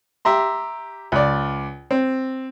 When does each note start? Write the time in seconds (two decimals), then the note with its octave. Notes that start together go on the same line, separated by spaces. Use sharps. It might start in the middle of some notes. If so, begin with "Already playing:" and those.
0.25 G4 E5 A#5 C6
1.12 C#2 D5
1.91 C4